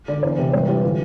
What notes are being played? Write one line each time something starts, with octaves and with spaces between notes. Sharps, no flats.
D3 D5
E2 C5
C3
G2 C5
E3 G4
D3 F4